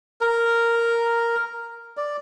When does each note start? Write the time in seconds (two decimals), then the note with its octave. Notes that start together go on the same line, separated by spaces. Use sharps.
0.21 A#4
1.97 D5